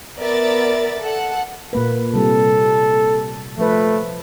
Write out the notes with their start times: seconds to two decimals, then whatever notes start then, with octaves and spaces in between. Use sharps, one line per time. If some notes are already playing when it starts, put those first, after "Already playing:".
0.19 B3 A#4 D5 E5 A6
1.02 A4 F#5
1.73 A#2 A#3 B4
2.14 C3 G3 A4
3.58 F3 A3 B4